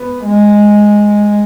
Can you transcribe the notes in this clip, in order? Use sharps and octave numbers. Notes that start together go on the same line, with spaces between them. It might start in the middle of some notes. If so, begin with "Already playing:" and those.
Already playing: B3
G#3